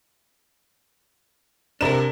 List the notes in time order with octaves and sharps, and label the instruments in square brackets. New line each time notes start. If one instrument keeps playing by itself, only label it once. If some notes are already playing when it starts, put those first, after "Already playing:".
[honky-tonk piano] C3 E7 [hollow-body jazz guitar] D4 A#4